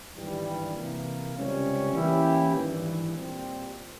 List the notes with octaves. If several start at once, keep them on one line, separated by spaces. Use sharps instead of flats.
G#1 G2 E3 G3
C3 E3 A#3
C#2 C3 G3 C#4
E3 A#3 C#4 E4 G4
G#1 G2 E3
A#2 G3 C4